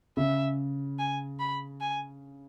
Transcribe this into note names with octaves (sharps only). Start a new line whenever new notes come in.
C#3 E5
G#5
B5
G#5